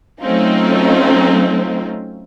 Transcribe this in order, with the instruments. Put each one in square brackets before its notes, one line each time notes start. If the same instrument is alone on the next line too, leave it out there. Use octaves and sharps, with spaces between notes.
[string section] F#3 A3 C4 C#4 D#4 F4